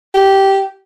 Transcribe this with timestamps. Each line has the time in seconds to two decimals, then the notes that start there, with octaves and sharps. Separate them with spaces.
0.15 G4